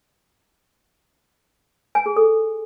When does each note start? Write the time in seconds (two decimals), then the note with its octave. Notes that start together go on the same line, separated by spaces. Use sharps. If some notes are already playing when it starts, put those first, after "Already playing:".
1.95 G#5
2.06 G#4
2.17 A4